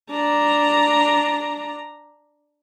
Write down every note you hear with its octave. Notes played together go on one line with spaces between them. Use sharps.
D4 A#5